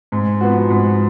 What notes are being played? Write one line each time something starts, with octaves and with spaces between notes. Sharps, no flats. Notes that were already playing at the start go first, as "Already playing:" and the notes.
G#2
F3 B3 F#4
G#2